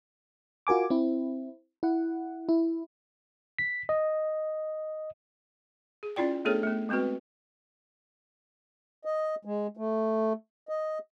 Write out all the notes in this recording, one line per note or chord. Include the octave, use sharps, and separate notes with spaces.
F4 F#4 A#4 G#5 D6
C4 E4
E4 F#5
E4
B6
D#5
G#4
C#4 E4 F4 D5 G5
A3 B3 D4 G#4 A4 C#5
A3 B3
G#3 B3 C4 F#4 B4
D#5
G#3
A3
D#5